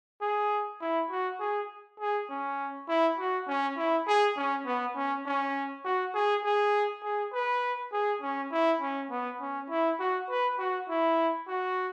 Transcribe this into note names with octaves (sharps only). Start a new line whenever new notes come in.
G#4
E4
F#4
G#4
G#4
C#4
E4
F#4
C#4
E4
G#4
C#4
B3
C#4
C#4
F#4
G#4
G#4
G#4
B4
G#4
C#4
E4
C#4
B3
C#4
E4
F#4
B4
F#4
E4
F#4